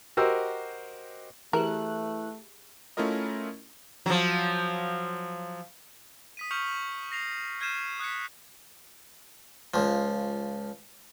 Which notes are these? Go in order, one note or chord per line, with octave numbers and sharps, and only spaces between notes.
F#4 G4 A#4 C5 D#5 E6
E3 A3 G4 G#4 A#4 F#6
A3 C#4 E4 F4 A#4 D#5
F3 F#3
D#6 B6 D#7
C#6 F6 G6 C#7 F7 F#7
A#6 C7 F7
F6 G6 G#6 C7 D#7 E7
D#6 F#6 G#6 B6 C#7
C#2 F3